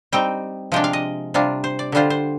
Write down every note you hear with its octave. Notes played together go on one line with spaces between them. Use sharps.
G3 C4 D#4 G5
C3 F3 G#3 D4 G5
F5
D#5
C3 G3 D4 F4
C5
D5
D3 G3 D4 F4 C5
C5